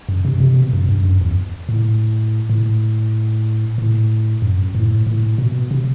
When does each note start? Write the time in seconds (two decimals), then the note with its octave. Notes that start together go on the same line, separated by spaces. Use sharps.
0.09 F#2
0.25 C3
0.40 C3
0.56 B2
0.73 F#2
0.89 G2
1.05 F#2
1.21 E2
1.69 A2
2.50 A2
3.78 A2
4.42 F#2
4.75 A2
5.07 A2
5.38 B2
5.71 C3